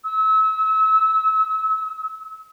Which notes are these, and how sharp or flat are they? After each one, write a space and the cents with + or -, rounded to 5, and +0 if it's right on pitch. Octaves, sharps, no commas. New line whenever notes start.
E6 -35